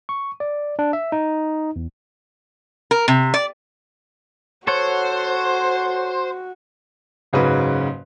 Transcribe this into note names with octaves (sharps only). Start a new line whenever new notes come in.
C#6
D5
D4
E5
D#4
E2
A#4
C3
D5
F#4 A4 C5 C#5 F#5
F#1 G#2 C#3 C#4 F#4 B4